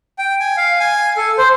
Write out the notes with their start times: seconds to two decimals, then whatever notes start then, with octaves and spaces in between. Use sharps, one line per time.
0.19 G5
0.40 G#5
0.57 F5
0.80 G#5
1.17 A4
1.38 C5